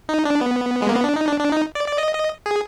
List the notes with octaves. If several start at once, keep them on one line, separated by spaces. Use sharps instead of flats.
D#4
D4
B3
G#3
A#3
B3
D4
D#4
D4
D4
D#4
D5
D5
D#5
D#5
G#4